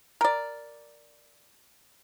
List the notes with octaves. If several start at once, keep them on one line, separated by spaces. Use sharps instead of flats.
A#4 D5